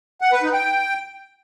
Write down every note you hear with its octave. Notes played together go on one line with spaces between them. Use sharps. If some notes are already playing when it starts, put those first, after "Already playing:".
F#5
B4
D#4
G5